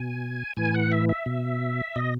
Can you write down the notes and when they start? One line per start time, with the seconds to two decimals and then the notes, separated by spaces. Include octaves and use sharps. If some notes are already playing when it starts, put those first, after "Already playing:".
Already playing: B2 G#5
0.57 A2 E3 G#5
0.74 F#5
0.92 E5
1.09 E5
1.26 B2
1.96 B2 D#5